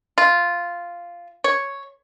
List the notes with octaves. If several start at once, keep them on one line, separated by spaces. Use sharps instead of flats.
F4
C#5